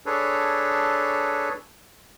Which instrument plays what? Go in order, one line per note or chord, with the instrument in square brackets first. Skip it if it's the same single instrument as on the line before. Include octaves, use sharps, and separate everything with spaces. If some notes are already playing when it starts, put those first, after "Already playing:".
[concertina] D4 G#4 A4 B4 C#5